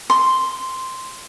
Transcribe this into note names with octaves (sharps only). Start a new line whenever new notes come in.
C6